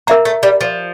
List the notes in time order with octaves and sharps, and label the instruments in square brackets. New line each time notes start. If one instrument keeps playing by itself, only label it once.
[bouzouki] A#3 [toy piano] A#4 E5 A#5
[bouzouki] A3
G3
F3